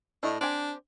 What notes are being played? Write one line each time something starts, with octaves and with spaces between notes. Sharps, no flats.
A2 D4 E4 D#5
C4 D4 G4 G#5